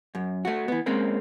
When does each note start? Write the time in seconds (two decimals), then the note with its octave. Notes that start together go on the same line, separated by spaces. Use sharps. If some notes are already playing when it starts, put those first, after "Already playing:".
0.15 F#2
0.45 A3 F#4
0.68 E3 B3
0.86 G#3 A#3 C4 C#4